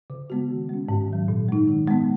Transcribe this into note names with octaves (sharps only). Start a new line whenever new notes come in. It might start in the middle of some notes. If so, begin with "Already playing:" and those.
C#3
G#3 B3 F#4
D#3
G#3 C#4
G#2
D#3 F#3
A#2
G#3 D#4
D#3
G#3 B3